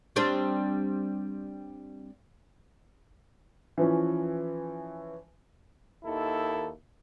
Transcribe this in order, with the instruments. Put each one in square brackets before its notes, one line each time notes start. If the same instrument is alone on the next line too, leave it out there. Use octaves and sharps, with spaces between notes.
[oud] G3 C4 D4
[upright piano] E3 F3 C#4
[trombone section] D#2 D#3 E4 A4